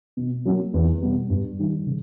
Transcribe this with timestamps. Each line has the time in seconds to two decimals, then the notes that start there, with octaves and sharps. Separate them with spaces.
0.17 B2
0.45 F#3 A#3 C#4
0.74 E2
1.02 B2 G3 B3
1.30 G2
1.59 D#3 G3
1.87 C#3